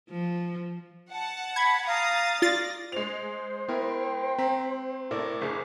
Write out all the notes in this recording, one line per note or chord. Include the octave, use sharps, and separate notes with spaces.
F3
F#5 A5
B5 G#6
F5 A#5 D#6 A6
F4 D5 A6 A#6
G#3 C5 F7
B3 E4 A#4 G5
C4 A#5 B6
A2 A4 A#4 D5 D6
F#1 G#4